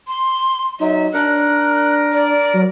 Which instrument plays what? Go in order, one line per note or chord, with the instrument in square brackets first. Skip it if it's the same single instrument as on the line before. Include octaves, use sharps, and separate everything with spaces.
[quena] C6
[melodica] F#3 [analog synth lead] D#4 [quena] E5
[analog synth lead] D4 [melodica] A#4 [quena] F#6
[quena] D5
[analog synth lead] F#3